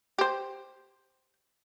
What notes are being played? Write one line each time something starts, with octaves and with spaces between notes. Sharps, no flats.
G4 C5